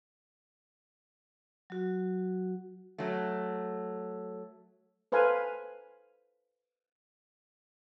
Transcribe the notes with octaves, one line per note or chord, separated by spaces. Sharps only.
F#3 F#4
F#3 A3
A4 B4 C5 F5 G#5